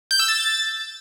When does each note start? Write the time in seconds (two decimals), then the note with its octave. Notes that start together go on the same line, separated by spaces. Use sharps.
0.11 G6
0.19 E6
0.28 A6